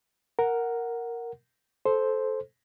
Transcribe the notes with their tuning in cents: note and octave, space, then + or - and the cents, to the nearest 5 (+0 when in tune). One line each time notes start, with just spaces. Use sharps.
A#4 +0 F#5 +0
A4 -15 C5 +0